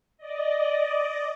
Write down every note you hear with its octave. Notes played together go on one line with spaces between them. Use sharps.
D5 D#5